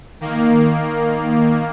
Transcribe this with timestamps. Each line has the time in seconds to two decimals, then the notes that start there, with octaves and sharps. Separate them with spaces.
0.21 D#3 A#3